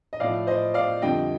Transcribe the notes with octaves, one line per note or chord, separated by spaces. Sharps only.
D#5
A2 F3 D5 F5
C5 D#5
D5 F5
F2 D3 G3 D#5 G5